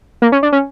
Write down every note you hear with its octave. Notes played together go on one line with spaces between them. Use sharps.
A#3
C#4
D4
C#4